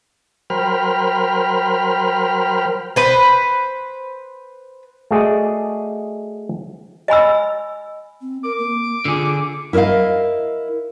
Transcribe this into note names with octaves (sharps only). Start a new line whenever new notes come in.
F#3 A#4 C5 G5 B5 F6
B4 C5
A3 F#4 G#4 D5 D#5
D#5 G#5 B5 E6
C4
A#4 D6
A#3
D3 F4 G#4
E4 A#4 C#5 D#5 F5